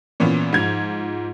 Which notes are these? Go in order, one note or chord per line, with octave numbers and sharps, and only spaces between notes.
A#2 E3 B3 C#4
G#2 F3 G#6 F7